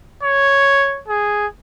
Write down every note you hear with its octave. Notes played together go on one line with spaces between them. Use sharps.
C#5
G#4